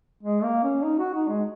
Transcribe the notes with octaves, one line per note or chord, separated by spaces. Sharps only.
G#3
A#3
C#4
D#4
F#4
D#4
G#3